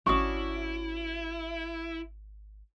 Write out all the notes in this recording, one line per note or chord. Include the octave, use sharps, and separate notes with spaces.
G#1 C#4 D4 E4 F#4 C#6 D#6